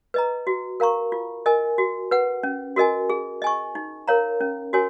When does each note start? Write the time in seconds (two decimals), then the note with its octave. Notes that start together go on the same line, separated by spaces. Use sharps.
0.14 B4 D#5 A#5
0.47 F#4
0.80 A#4 F5 A#5 C#6
1.12 F4
1.46 A#4 D#5 G#5
1.78 F#4
2.11 B4 F#5
2.43 C#4
2.76 F#4 A#4 D#5 G#5
3.10 G#4
3.42 D#5 G#5 C#6
3.75 D#4
4.08 A#4 C#5 F5 A#5
4.41 C#4
4.73 F#4 A#4 C#5 G#5